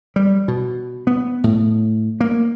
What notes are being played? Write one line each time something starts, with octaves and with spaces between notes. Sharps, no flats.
G3
B2
B3
A2
A#3